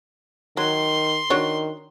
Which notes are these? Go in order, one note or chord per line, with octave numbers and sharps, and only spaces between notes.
D#3 F#3 C6
D#3 D4 F#4 C#5